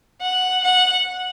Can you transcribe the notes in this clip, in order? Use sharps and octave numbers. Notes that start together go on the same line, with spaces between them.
F#5
F#5